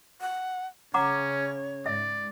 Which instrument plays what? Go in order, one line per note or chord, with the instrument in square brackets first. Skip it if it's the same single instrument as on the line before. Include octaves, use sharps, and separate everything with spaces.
[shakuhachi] F#5
[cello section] C#3 [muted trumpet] C#4 [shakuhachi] C#5 [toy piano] F#5 A#5 D6
[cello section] G#2 [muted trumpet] D5 [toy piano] E5